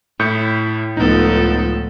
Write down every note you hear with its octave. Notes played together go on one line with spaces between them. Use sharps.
A2 E4 G6 C#7
C#2 A2 F3 B3 D#4 A4